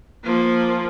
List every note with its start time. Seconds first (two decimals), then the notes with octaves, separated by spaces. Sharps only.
0.23 F3 A#3